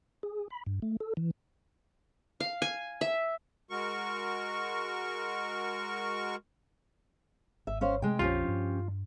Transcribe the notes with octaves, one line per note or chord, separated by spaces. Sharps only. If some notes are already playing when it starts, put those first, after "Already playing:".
G#4
B5
G2
A3
A4
E3
F5
G#5
E5
G#3 F#4 A#4 C#6
G#1 E5
C#4 C5 F5
C3 G#3 A3 G5
A#1 F2 F3 C#4 F4 G4
G2 D4